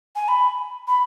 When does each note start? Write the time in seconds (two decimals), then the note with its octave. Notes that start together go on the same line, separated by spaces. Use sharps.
0.15 G#5
0.28 B5
0.87 B5